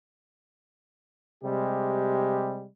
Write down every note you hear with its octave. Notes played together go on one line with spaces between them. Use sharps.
C3 G3 G#3 G4